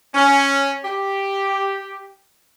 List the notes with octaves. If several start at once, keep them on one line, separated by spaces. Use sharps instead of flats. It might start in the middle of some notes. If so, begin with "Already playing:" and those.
C#4
G4